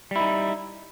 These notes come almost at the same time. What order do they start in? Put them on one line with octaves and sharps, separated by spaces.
G3 E4 D#4